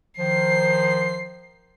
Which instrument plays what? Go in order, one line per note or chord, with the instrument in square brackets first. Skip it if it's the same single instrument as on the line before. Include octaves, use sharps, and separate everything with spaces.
[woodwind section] D#3 F3 C5 [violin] C7